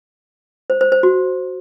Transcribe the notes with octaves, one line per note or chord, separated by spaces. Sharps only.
C5
C5
C5
F#4